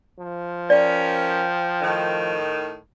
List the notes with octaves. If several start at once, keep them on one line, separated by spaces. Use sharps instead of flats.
F3
C#4 A#4 D5 G5
A2 D#3